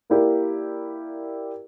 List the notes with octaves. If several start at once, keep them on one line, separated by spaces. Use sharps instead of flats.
A#3 E4 G4 A#4 D5